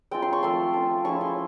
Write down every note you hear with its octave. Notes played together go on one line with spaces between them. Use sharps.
G#3 C4 F4 G5
C6
C#6
F3 A3 C4 C6
A3 C#4 F4
F3 G#3 C#4 E4 C#6
C6